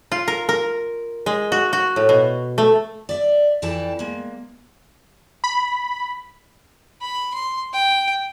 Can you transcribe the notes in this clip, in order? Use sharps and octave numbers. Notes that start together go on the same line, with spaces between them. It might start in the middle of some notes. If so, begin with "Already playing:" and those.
F4
A#4
A#4
G#3
F#4
F#4
A2
B2
A3
D5 E5
F2 E3 E4 D5 G5 A5
G#3 A#3
B5
B5
C6
G5